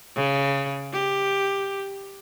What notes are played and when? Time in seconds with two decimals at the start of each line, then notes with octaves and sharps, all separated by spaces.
0.15 C#3
0.93 G4